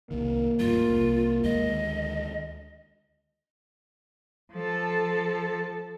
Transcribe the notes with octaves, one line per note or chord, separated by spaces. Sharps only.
C2 D#3 A#3
E2 A2 G3 F4
C2
D2 D#3 G#3 D#5
F3 A4